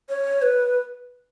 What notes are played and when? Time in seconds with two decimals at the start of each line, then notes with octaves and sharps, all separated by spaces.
0.09 C#5
0.42 B4